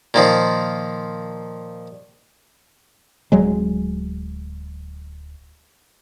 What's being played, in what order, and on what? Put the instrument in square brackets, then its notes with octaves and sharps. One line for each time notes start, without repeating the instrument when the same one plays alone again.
[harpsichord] A#2 D#3 F3
[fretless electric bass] D1 F#3 G#3